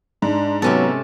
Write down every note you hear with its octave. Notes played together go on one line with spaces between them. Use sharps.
G#2 D4
C3 F#3 B3 C#4 A4